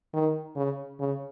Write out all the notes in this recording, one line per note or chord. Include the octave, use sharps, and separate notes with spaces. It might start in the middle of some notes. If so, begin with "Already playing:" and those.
D#3
C#3
C#3